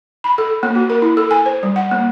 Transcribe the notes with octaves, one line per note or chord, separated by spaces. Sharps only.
B5
A4
A#3
F#4
A#4
E4
A4
G#5
C5
G3
F#5
A#3